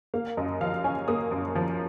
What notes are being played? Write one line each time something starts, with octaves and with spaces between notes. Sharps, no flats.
A#3 F5
F#2 D#5
F3 F5
C#4 G#5
A#3 D#6
F#2
F3